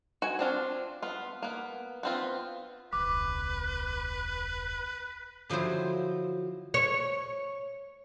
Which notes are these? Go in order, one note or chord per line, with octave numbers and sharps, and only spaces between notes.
F#4 G#5
C4 D4 F4
B3 F4
A#3 B3
B3 C4 F4
E1 C#2 B4 D6
D3 F3 F#3 E4 C5
C#5